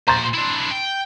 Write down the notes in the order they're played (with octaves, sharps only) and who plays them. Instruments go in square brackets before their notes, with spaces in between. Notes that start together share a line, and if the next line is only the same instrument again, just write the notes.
[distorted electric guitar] A#2 C5 [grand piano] A#5 C6 A6
[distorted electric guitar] D4 E4
G5